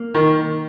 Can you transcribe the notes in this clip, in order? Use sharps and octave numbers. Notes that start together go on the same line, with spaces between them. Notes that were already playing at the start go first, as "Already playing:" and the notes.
Already playing: A#3
D#3